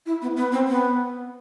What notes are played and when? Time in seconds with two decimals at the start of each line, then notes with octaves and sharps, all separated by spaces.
0.06 E4
0.22 B3
0.37 B3
0.52 C4
0.68 B3